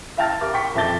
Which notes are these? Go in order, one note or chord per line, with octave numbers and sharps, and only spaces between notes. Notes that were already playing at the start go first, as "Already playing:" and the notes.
E5 F5 G5 A5 F6 A6
G4 A#4 D6
G5 C#6 B6
F2 E5 A5 D6 A6 G7